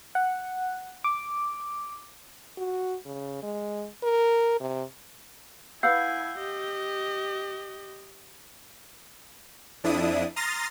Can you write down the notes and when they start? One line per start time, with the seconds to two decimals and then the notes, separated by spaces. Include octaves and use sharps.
0.15 F#5
1.04 D6
2.58 F#4
3.06 C#3
3.43 G#3
4.03 A#4
4.60 C3
5.83 E4 B4 F5 F#5 G#5 E6 G6 C7
6.38 G4 D#5
9.84 F2 D4 E4 D#6
10.36 A#5 C6 D#6 F6 A6 A#6